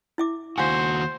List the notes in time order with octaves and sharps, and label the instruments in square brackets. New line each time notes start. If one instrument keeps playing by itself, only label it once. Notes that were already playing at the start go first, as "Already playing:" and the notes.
[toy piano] E4 E5 D6
[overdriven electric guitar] D#2 F#4 [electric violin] C5 [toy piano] F5 G#5